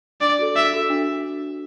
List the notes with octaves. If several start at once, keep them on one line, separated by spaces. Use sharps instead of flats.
D4 D5
F#4 A4
D4 E5
F#4 A4
D4